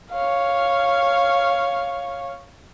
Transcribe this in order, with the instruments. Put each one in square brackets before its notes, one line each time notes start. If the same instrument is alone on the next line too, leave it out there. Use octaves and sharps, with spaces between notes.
[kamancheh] C#5 F5